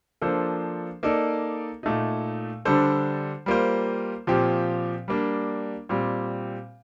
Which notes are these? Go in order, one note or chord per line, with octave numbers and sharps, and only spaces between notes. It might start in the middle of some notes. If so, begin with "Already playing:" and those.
F3 A#3 D4 A4 C5
A#3 D#4 A4 D5
A#2 A3 D#4
D3 G3 D4 A4 C5
G3 A#3 F4 C5
A#2 F3 C4 G4
G3 A#3 D4
A#2 G3 C4